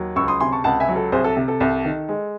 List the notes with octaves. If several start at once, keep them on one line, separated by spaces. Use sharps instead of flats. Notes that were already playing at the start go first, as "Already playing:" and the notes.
Already playing: D#2 F#3
C#2 C#6 E6
C6 D#6
C3 G#5 C6
A5 C#6
C#2 F#5 A5
E5 G#5
F#3
A4
C2 G#4 C5
A4
C3
A4
C2
D#3
G#3